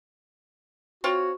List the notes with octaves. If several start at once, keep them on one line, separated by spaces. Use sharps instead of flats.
C4 F4 F#4 C#5